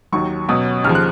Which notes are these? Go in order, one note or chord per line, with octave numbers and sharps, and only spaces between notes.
D#2 D#3 F#3 C#6
B2 F#3 C#4 D#6
D#2 C#3 F3 F6
F#6